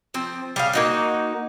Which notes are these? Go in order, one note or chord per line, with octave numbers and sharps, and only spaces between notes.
F3 C4
G3 G#4 F5
A#3 D#4 F#4